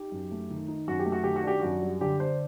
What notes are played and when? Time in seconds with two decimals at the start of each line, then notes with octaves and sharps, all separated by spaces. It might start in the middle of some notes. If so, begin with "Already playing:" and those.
Already playing: D#4 G4
0.12 F#2
0.32 A3
0.50 D#3
0.68 D#4
0.88 F#2 F#4
0.99 G4
1.06 A3
1.12 F#4
1.24 D#3 G4
1.36 F#4
1.44 D4 G4
1.60 F#2 F#4
1.82 G3
2.01 D3 G4
2.20 D4 C5